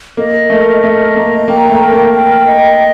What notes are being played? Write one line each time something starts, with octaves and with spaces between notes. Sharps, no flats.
A#3 D#5
A3 A#4
A3 D#5
A#3 A#5
A#3 G5
A3
A#4
A#3
G5
D#5